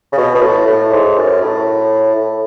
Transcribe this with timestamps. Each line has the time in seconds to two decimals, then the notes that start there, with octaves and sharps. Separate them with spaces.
0.12 C#3
0.18 B2
0.35 B2
0.42 A2
0.66 A2
0.91 G#2
1.16 F#2
1.41 A2
2.16 A2